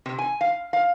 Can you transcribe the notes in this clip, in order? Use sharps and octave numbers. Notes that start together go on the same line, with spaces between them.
C3
G#5
F5
F5